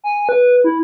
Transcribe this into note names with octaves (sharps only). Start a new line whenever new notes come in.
G#5
B4
E4